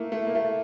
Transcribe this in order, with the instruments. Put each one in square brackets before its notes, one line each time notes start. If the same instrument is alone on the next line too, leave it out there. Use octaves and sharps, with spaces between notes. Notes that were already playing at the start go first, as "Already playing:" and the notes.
Already playing: [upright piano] A3 A#3 [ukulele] E4
[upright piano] A3
A#3
A3